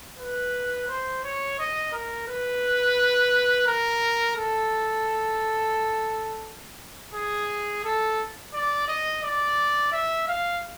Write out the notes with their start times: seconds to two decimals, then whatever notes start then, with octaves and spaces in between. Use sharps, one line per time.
0.19 B4
0.88 C5
1.24 C#5
1.59 D#5
1.93 A#4
2.28 B4
3.67 A#4
4.36 A4
7.14 G#4
7.85 A4
8.53 D5
8.88 D#5
9.23 D5
9.92 E5
10.28 F5